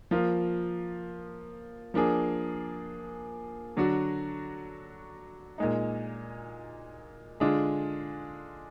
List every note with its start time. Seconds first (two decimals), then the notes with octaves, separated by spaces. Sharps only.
0.11 F3 A#3 F4
1.94 F3 A#3 D4 G#4
3.76 D3 F#3 D4 F#4
5.58 A#2 G#3 D#4
7.40 D3 G#3 D4 F4 G#4